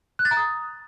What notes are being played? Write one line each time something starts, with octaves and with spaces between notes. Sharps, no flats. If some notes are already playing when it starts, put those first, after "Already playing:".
F#6
A6
A#5
D#6